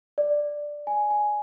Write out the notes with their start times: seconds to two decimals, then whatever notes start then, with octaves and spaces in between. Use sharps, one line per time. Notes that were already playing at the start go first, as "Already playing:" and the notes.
0.18 D5
0.87 G#5
1.11 G#5